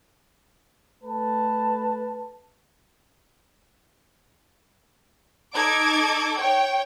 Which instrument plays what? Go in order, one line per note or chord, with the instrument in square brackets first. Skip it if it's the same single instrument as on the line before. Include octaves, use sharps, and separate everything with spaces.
[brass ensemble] A3 B4 A5
[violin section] D#4 A4 D6 G#6
C#5 G5